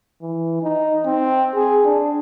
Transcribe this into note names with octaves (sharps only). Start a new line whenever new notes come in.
E3
D#4
C4
G#4
D4